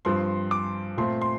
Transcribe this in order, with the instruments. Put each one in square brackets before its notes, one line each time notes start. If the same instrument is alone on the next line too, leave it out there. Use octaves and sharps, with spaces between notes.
[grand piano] G2 F3 C4 C6
D6
A#2 A3 C4 C6
C6